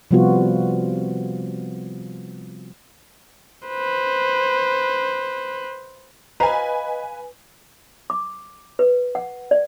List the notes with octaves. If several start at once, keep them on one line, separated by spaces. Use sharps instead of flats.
C3 F3 G3 B3 F4 F#4
B4 C5
B4 C5 D#5 F5 G#5 A#5 B5
D6
B4
F#5
D5